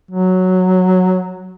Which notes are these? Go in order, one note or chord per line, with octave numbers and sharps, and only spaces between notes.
F#3